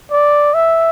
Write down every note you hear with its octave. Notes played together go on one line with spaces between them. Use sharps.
D5
E5